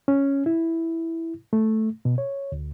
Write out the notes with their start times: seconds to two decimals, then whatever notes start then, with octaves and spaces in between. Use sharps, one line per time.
0.08 C#4
0.46 E4
1.53 A3
2.05 B2
2.18 C#5
2.52 D2